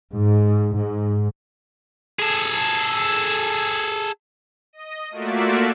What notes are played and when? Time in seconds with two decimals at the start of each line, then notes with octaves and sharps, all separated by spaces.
0.14 G#2
0.77 G#2
2.19 G#4 A4
4.73 D#5
5.11 A3 A#3 F4 F#4 D5 E5